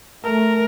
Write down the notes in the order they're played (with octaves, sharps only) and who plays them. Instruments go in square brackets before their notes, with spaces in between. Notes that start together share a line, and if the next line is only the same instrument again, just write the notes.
[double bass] A3 [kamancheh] A#4